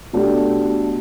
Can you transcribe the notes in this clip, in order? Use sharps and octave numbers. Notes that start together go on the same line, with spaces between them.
B2 A3 D4 G4